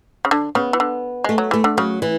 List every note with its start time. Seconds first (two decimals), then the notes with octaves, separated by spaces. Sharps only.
0.25 C#3
0.31 D3
0.55 C#3 B3
0.73 E3
0.80 D3
1.24 G#3 A3
1.38 F#3
1.51 E3 A3
1.64 D3
1.77 C#3 F#3
2.02 E3